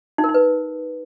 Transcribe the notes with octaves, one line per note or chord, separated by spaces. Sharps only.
D#4
A#4
D#4
B4